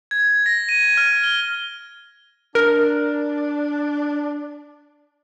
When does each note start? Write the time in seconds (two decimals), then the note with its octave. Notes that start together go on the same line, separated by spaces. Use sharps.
0.11 G#6
0.46 A#6
0.69 D#7
0.97 F6
1.24 G7
2.55 D4 A#4